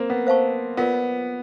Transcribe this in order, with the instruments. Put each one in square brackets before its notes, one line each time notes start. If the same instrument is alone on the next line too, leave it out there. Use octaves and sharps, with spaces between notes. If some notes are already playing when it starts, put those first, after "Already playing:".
Already playing: [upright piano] A#3 C4
B3
[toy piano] C5 F5 A5 C#6
[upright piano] B3 [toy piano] F4 A#4 D5